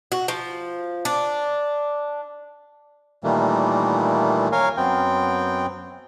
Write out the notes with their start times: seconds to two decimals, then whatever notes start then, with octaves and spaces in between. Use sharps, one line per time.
0.12 F#4
0.28 F3
1.05 D4
3.24 A#2 D#3 E3 G3 A3 A#3
4.52 A#4 C#5 F5 G#5
4.77 F#2 B3 C4 G5